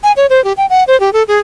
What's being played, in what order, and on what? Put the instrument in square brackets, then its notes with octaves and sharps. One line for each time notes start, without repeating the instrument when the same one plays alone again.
[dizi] G#5
C#5
C5
G4
G5
F#5
C5
G4
A4
G#4